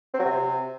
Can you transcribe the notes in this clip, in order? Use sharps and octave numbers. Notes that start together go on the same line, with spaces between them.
C4
F#3
C3